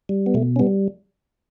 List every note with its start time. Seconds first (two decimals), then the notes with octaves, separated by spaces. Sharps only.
0.09 G3
0.26 B3
0.34 B2 A3
0.56 C#4
0.59 G3 B3